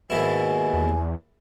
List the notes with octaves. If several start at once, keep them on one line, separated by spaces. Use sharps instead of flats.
D#2 G#2 B2 E4 G#5
E2